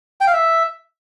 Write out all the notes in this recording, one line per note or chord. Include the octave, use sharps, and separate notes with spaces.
G5
F5
E5